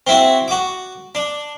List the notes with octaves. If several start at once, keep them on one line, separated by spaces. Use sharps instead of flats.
C4 E4 F#4
F#4 D6
D4